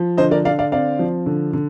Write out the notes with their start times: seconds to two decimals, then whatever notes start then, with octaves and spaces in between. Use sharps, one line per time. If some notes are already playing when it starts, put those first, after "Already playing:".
Already playing: F3
0.17 D3 C5 D#5
0.31 A#4 D5
0.45 D3 D5 F5
0.59 D5 F5
0.72 C4 D5 F5
0.99 F3
1.26 D3
1.53 D3